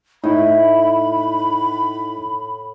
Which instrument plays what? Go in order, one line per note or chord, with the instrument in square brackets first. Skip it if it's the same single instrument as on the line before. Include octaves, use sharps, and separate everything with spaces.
[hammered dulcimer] A2 [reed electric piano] D#4 E4 [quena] B5